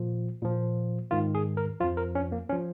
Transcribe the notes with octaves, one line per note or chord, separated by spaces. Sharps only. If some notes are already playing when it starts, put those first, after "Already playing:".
Already playing: A#2 F3
A#2 F3
G#2 D#3 F4
G#4
A#4
F2 F3 F4
A#4
C#4
A#3
C#4
F3